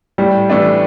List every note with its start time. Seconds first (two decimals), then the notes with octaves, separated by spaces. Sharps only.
0.18 A2 G3
0.50 E3 A3 D4